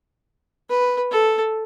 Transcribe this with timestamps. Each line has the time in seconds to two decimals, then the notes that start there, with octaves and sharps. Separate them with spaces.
0.70 B4
1.11 A4